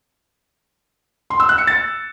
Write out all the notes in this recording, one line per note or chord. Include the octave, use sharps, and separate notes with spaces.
C6
E6
F#6
C#7
A6